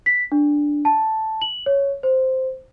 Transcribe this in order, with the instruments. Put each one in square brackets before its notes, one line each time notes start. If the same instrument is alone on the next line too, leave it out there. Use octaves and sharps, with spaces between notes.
[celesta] B6
D4
A5
F#7
C#5
C5